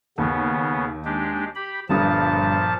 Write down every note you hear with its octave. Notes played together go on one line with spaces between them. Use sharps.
D#2 C#3 B3
G#3 D4 G4
G4 B5
G1 G2 A#2 F3 A5 D#6